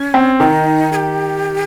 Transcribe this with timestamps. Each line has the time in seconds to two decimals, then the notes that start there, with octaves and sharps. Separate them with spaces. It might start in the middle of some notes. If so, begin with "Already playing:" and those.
Already playing: C#4
0.14 C4
0.40 D#3 D#4
0.92 G#4
0.96 G4